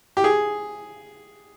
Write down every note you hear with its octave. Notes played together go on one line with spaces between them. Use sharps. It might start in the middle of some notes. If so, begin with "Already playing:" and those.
G4
G#4